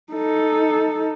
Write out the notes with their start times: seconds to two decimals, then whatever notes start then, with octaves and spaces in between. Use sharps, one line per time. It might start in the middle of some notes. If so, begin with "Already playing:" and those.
0.13 D#4 A4